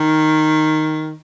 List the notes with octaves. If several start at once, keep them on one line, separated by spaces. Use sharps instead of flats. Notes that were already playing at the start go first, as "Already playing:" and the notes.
Already playing: D#3